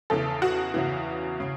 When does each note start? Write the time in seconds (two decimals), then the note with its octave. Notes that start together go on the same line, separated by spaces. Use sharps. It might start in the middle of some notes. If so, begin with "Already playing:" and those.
0.10 E2 C#3 E3 A4
0.42 F#4
0.74 E2 C#3 E3
1.40 C#3